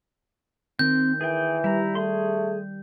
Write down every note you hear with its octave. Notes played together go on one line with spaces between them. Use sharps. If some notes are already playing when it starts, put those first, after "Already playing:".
D#3 C4 G6
E3 G#4 G5
G3 E4 A#5
A3 G#4 C6